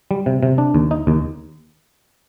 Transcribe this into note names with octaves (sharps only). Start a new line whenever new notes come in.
G3
C3
C3
D4
D#2
D#4
D#2